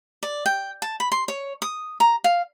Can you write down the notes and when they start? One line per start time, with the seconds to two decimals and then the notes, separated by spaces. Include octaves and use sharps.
0.23 D5
0.46 G5
0.82 A5
1.00 B5
1.12 C6
1.28 C#5
1.62 D#6
2.00 A#5
2.24 F5